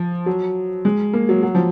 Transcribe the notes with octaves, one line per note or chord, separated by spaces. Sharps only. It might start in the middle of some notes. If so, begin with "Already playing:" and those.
Already playing: F3
F#3
G#3
A#3
F#3
F#3
F3